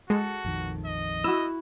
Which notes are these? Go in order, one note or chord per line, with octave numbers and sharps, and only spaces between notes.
G#3 F#4 A4
A#1 F2 D#3
D#5
E4 F#4 E6